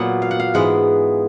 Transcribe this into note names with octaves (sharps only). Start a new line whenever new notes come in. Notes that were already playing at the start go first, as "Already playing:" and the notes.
Already playing: A#2 F#3 B3 F#5
F5
F#5
F5
G#2 E3 G#3 B3 F#5